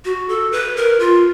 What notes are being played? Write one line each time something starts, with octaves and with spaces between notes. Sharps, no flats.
F#4
A4
B4
A#4
F4